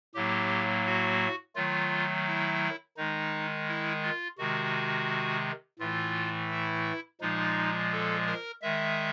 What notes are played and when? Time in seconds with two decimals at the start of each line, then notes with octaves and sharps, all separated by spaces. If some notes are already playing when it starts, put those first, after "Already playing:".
0.15 A2 F#3 A#3 G4
0.86 F#4
1.55 D#3 F#3 A3 F4
2.26 E4
2.97 D#3 G#3 D#4
3.68 E4
4.03 F4
4.38 C3 D#3 G#3 F#4
5.79 A2 E3 A3 F4
6.50 E4
7.21 A#2 F3 G#3 D#4
7.92 A4
8.27 A#4
8.62 D#3 G#3 E5